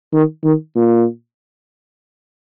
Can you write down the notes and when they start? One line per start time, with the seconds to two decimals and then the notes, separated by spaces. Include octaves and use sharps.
0.13 D#3
0.44 D#3
0.75 A#2